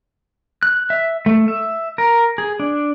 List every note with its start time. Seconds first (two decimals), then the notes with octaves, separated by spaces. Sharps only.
0.63 F#6
0.90 E5
1.26 A3
1.48 E5
1.98 A#4
2.38 G#4
2.60 D4